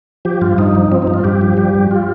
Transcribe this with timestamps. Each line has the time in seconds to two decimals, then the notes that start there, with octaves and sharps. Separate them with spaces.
0.25 F3 G4
0.41 G2 F4
0.58 G2 D#4
0.75 F3
0.92 F3 C4
1.02 D#4
1.07 G2
1.14 F4
1.24 G2 G4
1.41 F3
1.57 G3 G4
1.75 G2
1.91 F4